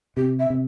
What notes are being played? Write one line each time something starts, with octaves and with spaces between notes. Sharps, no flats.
C3 G4
E5
C3